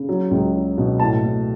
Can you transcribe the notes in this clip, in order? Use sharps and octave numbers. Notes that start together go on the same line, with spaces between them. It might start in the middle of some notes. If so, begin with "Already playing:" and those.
Already playing: C#3
F#3
C#2
F#3
B2
A2 A5
A2